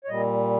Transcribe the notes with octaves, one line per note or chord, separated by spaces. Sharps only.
C#5
A#2 G3 D#5